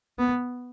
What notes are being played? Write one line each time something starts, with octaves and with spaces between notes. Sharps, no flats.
B3